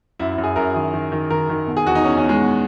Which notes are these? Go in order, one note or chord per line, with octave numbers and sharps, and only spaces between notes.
F#2 E4
E4
F#2
G#4
F#2 A#4
D#3 G#4
D#3
D#3
D#3 A#4
D#3
B2
G#4
E2 F#4
D#4
E2 C#4
C#4
E2
G#3
B2